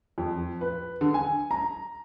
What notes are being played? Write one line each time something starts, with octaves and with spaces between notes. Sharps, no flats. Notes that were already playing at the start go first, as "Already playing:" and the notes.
F2
B4
D3
G#5
A#5